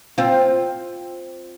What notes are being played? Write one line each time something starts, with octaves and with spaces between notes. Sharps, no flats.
C4 F4